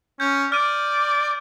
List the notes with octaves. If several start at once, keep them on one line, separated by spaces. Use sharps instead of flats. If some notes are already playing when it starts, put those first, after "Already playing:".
C#4 G6
D5 F6 D#7